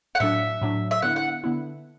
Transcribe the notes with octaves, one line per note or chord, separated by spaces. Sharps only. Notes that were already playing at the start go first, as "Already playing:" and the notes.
F#5
A2 F#3 D4 E5
A2 F#3 D4
E5
D3 B3 E4 F#5
F#5
D3 B3 E4